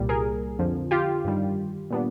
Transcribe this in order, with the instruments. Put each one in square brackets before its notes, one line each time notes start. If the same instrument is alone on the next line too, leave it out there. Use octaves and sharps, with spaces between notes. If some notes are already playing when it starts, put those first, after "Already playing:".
Already playing: [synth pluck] C2 A#2 G3
G#4 A#4
F2 D3 F3
F4 G4
G2 D#3 G3
A#2 G3 B3 D4